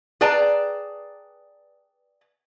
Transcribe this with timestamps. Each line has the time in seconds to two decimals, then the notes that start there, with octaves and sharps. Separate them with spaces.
0.21 G#4 B4 D5 G5 A5 A#5